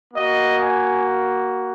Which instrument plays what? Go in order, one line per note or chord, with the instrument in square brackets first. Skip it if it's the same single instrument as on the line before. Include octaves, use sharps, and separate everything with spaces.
[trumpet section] A#3 F#4 D#5
G#5